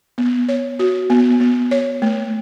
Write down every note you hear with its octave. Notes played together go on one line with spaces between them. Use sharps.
B3
C#5
F#4
B3
B3
C#5
A3